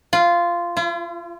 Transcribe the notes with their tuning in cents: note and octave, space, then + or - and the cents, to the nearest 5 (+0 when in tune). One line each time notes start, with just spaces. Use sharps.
F4 -10
F4 -45